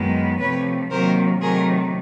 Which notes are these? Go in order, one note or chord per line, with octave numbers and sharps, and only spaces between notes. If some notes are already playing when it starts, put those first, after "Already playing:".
Already playing: F#2 D#3 G#3 B3
C3 F3 A3 B4 C#5
C3 D#3 F#3 A#3 A#4 C5
C3 D#3 F#3 A3 G#4 A#4